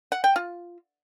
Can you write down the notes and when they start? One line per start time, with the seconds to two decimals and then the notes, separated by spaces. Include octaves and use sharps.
0.12 F#5
0.24 G5
0.36 F4